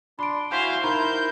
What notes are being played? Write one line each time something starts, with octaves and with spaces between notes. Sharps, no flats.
D4 B5 C6 D7
E4 F#4 C5 F5 G#5 G6 B6 C7
D#4 E4 A#4 C5 A#5 B5 G6